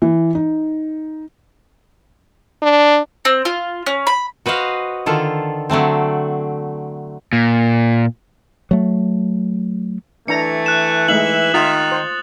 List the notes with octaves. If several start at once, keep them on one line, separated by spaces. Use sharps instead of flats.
E3
D#4
D4
C4
F4
C#4
B5
F#4 B4 C5 D#5 F5
D3 D#3 F4 A4
D3 F#3 A3 C4
A#2
F#3 A3
E3 A3 D4 A#5 C#7
F#6 E7
G#3 A3 D#4 E5 F#7
D#3 F4 D#6 A6
C5